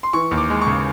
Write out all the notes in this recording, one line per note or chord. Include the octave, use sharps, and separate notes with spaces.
C6
E3 C#6
D#2
D6
G#3
C#6
C#3